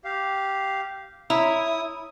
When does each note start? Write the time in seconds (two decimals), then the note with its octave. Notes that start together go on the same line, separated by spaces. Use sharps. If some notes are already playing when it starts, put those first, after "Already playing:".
0.04 G4 F5
1.30 E4 C#5 A#5 D#6 E6